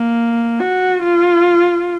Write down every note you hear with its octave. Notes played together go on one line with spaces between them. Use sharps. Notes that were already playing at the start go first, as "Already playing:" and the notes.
Already playing: A#3
F#4
F4